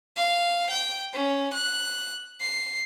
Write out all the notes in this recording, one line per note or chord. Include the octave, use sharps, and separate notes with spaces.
F5
G5
C#4
F#6
C7